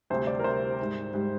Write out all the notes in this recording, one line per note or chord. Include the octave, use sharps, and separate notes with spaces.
D2 C3 G3 C5
D5
A#4
D2 C3 G3 C5
G#2 G3
G#2 G3